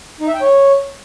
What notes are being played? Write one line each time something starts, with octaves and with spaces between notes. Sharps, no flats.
D#4
E5
G5
C#5